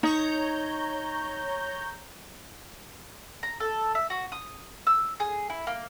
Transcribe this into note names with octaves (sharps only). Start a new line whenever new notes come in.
D#4 C#5 A#5 G6
A#5
A4
E5
F#4
D#6
E6
G#4
E4
A#3